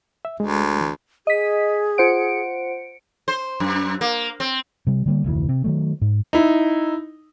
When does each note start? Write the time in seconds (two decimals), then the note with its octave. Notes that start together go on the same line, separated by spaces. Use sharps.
0.25 E5
0.40 D2 G#3
0.81 E3
1.27 G#4 D#5 B6
1.98 F4 C5 F#5 C#7 D7
3.28 C5
3.60 F#2
4.01 A#3
4.40 C4
4.87 C3 G3
5.06 D3 G3 A#3
5.24 F1 D2 E3
5.49 C3
5.64 D#3 F#3 A3
6.01 G#2
6.33 D#4 E4